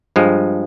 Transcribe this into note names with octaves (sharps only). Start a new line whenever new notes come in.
G2 F3 G#3